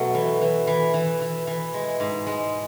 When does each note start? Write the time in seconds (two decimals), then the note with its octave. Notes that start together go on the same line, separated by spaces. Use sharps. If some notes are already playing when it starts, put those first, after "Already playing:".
Already playing: B2 F#3 A3
0.14 E3
0.41 E3
0.67 E3
0.94 E3
1.21 E3
1.47 E3
1.74 G#3
2.00 G#2
2.27 G#3